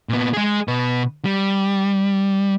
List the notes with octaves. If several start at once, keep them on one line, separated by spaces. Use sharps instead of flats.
A#2 B3
G#3 G#4
B2 B4
G3